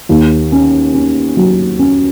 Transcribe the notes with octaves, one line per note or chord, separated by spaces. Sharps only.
D#2
C#4
C#4
F#3
C#4